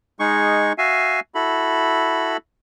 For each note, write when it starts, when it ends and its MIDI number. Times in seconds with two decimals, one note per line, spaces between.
0.20 0.73 56
0.20 0.73 63
0.20 0.73 68
0.20 0.73 85
0.78 1.20 66
0.78 1.20 76
0.78 1.20 77
0.78 1.20 80
1.35 2.37 64
1.35 2.37 66
1.35 2.37 69
1.35 2.37 83